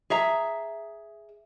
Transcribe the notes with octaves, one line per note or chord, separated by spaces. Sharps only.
G#4 E5 A#5